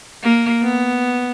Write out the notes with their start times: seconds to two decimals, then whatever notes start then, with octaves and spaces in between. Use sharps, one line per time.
0.23 A#3
0.63 B3